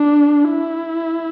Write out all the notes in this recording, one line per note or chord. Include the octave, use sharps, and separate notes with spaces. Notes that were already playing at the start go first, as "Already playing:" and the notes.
Already playing: D4
E4